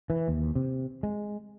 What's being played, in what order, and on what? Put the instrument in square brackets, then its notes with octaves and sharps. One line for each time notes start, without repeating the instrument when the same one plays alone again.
[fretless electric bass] E3
D#2
C3
G#3